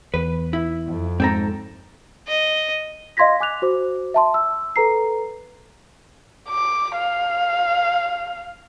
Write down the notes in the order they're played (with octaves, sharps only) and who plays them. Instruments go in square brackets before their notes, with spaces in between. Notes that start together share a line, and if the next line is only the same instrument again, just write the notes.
[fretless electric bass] E2 [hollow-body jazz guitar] B4
[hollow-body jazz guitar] E4
[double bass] F2
[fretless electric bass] G#2 [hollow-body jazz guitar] C4 A4 A#5
[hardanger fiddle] D#5
[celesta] D#5 F5 C6 G#6 A#6 B6
G#5 D6 F#6 F7
F#4 C5 D6
E5 A5 C6
E6
A4 B4 A#5 C7
[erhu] D6
F5